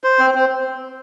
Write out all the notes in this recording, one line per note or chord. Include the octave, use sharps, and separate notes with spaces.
C5
C4
C4